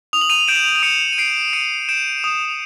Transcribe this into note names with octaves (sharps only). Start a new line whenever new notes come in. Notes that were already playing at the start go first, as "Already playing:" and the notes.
D#6 F7
F#7
D#7 F7
G6 D7 E7
D#6 C#7 D#7
D#7
G6 C7 D7
D#6 C#7 D#7
G6 D7 E7
D#6